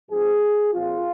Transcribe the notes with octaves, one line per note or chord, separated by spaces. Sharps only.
G#2 F3 C4 G#4
A#2 F3 C4 F4